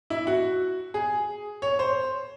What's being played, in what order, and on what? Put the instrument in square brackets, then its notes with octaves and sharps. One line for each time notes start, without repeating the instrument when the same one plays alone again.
[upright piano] E4
F#4
G#4
C#5
C5